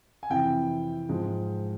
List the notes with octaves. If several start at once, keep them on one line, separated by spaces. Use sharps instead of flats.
G#5
F2 C3 E3 G5
G#2 F3 G#3